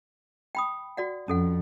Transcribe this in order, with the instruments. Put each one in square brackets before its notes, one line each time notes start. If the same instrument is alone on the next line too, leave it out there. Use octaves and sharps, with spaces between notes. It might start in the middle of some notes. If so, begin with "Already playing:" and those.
[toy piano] G5 B5 D#6
F#4 D5 F#5
[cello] F2 [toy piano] C#4 A4 F#5